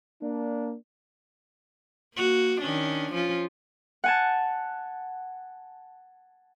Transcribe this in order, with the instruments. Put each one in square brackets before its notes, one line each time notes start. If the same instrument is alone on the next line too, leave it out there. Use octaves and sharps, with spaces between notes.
[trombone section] A#3 D4
[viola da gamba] A#3 F#4
D#3 C#4 D4
F3 C#4 F4
[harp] F#5 G#5 A5